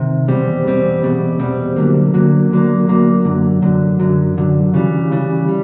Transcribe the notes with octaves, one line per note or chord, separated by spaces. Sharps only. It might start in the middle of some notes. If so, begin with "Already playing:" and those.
Already playing: C3 D#3
E2 B2 G3 C4
E2 B2 G3 C4
E2 B2 G3 C4
E2 B2 G3 C4
D2 D3 F#3 A#3
D2 D3 F#3 A#3
D2 D3 F#3 A#3
D2 D3 F#3 A#3
F#2 D3 F#3
F#2 D3 F#3
F#2 D3 F#3
F#2 D3 F#3
C#3 E3 G3
C#3 E3 G3
G3